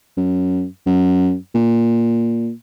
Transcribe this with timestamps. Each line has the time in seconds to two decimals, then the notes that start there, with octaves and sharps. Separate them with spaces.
0.17 F#2
0.87 F#2
1.55 A#2